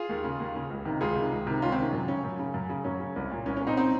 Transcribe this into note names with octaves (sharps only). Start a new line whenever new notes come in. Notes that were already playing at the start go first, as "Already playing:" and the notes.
Already playing: F4 G#4
D#2
C#3
D#2
C#3
C#2
C3 D#3
C#2 F4 G#4
C3 D#3
C#2
C3 D#3
C#2 C#4 F4
C4
C3 D#3 C#4
F#2
C#3 C#4
F#2
C#3
F#2
C#3
F#2 C#4
C#3
C2
A#2
C2 C#4
C#4
A#2
C4 D#4
C4 D#4